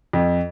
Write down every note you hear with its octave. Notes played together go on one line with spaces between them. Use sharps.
F2